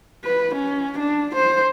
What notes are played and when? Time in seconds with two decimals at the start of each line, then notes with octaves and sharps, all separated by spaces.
0.24 B4
0.55 C#4
0.99 D4
1.36 C5